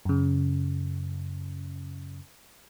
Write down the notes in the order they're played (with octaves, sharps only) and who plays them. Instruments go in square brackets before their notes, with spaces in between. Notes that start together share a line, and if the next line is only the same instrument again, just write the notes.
[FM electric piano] F#2 C#3